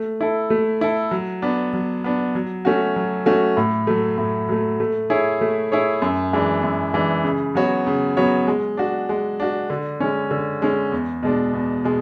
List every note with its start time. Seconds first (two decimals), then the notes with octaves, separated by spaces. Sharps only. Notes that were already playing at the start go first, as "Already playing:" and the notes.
Already playing: A3
0.21 E4 A4
0.50 A3
0.81 E4 A4
1.11 F#3
1.42 B3 D4
1.73 F#3
2.04 B3 D4
2.35 F#3
2.65 A3 C#4 F#4
2.96 F#3
3.26 A3 C#4 F#4
3.57 A2
3.87 F#3 A3
4.18 A2
4.49 F#3 A3
4.80 A3
5.10 E4 G#4 C#5
5.41 A3
5.72 E4 G#4 C#5
6.02 F#2
6.33 E3 G#3 D4
6.63 F#2
6.94 E3 G#3 D4
7.24 C#3
7.55 F#3 B3 F#4 C#5
7.87 C#3
8.17 F#3 B3 F#4 C#5
8.47 G#3
8.77 D4 F#4
9.09 G#3
9.40 D4 F#4
9.70 D3
10.00 G#3 C#4
10.31 D3
10.62 G#3 C#4
10.92 E2
11.23 B2 G#3 D4
11.53 E2
11.84 B2 G#3